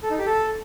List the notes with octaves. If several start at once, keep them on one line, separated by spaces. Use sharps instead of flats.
A4
D#4
G4
A4